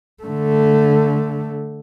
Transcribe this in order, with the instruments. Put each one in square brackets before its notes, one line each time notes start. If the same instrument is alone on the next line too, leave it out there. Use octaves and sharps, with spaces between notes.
[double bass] D3 A3